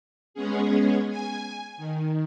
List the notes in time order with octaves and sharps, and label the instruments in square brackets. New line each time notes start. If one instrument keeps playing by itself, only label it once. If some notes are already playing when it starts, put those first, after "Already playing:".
[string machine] G#3 B3 C#4 G#4
G#5
D#3